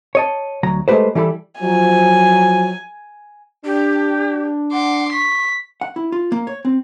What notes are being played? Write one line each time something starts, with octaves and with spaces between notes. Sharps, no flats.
C#5 D#5 A5
D2 F#3 A#5
G#3 A3 B3 G4 B4 C5
E3 G3 E4 A4 B5
F3 F#3 G#5
D4 G4
F#5 C6 D6
C#6 B6
F#5
E4
F4
A#3
C#5
C4